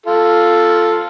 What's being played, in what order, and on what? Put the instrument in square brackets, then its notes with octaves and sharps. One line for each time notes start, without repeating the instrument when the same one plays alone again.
[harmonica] F4 A4